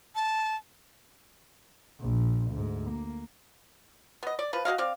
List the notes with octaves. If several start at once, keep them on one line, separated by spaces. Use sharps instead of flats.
A5
A#1
D2 G#2
A#3
B3 D#5
D5
F3 B4
F#4 G4 D#5 F5
C4 D5 F5